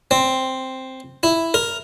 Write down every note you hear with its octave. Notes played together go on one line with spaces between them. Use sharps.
C4
E4
A#4